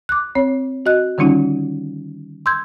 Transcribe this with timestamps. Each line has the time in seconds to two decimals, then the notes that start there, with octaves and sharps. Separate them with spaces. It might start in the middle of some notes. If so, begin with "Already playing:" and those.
0.09 D6 F#6
0.35 C4 C#5
0.86 F#4 D#5 F#6
1.18 D3 D#3 G3 C#4 D#4 F4
2.46 C6 E6 G6 G#6